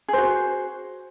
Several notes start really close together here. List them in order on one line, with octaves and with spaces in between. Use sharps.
G#4 C5 F#4